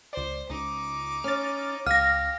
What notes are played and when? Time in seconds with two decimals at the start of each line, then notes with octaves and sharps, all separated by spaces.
0.13 C#2 C5 D5
0.50 C#2 D#4 D6
1.24 C#4 F6 A6
1.86 C#2 G4 F5 F6 A#6